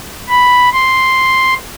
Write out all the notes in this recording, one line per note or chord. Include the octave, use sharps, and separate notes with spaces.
B5
C6